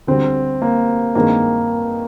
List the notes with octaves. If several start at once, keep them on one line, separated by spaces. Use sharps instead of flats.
D2 D3 G3 C4
A#3
G2 D#3 G#3 A#3 C4